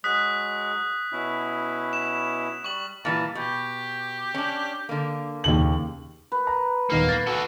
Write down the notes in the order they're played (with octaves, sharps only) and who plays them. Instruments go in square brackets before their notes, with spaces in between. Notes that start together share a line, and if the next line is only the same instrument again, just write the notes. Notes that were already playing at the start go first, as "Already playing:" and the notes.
[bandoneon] F#3 G#3 [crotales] D#6 F#6 B6
[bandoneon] B2 C#4 E4
[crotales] E7
[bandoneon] G3 [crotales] C#6 F#7
[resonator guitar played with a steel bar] A#2 E3 G3 [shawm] A5
[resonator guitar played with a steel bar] B2 [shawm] G4
[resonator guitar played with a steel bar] C#4 D4
D3 A#3
[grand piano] D#2 C#3 F#7
[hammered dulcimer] B4
[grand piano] A#5
[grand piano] D#1 D#3 B3 [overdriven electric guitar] A#3
[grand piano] A6
[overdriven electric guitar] F#4 A4